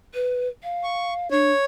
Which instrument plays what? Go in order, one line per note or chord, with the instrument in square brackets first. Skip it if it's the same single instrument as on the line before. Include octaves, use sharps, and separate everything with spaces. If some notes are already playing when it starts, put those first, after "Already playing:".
[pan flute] B4
F5
[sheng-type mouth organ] C#6
[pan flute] D4 [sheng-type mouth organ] C#5